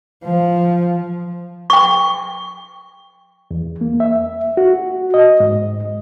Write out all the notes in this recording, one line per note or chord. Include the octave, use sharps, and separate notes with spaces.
F3
G5 C#6
E2
A#3
E5
F#4
D#5
G#2